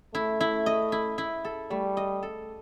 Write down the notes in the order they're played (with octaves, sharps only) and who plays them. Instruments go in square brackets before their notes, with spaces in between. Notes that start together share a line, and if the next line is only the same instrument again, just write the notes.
[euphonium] A3 [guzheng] E4
[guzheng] E4
D#5
E4
E4
A4
[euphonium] G3 [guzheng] A3
[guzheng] D#5
A4